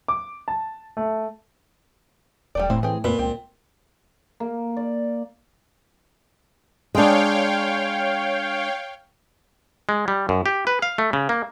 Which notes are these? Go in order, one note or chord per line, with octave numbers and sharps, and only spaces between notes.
D6
A5
A3
E1 G3 A3 D5
A2 C4
E3 C4 G#4
F2 A#2 B4
C#2 C4
A#3
D5
G#3 D4 C#5 F5 G5
G#3
G3
F#2
G4
B4
F5
A3
C#3
A#3